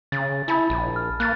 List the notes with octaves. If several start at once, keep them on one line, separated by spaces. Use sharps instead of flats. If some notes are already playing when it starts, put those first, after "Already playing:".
C#3 A6
E4 G#5 A5 B5
A#1
F6
A#3 F#6 A6